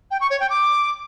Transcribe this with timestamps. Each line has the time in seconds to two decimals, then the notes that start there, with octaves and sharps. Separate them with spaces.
0.11 G5
0.21 C#6
0.30 C#5
0.40 G5
0.50 D6